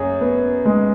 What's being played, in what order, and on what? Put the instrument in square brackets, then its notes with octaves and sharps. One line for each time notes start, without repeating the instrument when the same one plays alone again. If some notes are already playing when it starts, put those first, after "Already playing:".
Already playing: [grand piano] F#2 [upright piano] G#4 C#5
[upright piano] B3
G#3